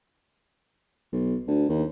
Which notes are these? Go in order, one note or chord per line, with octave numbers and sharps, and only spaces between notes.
B1
D2
D#2